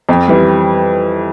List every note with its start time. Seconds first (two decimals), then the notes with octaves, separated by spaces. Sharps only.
0.09 F2
0.28 E3 G3